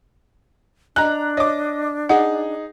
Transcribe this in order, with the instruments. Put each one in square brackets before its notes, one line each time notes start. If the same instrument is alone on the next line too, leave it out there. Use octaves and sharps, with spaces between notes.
[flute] D4 [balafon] D#5 G#5 [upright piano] A#5 F#6
[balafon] C#5 [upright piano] D#5 D6
[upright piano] D#4 G#4 [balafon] F#5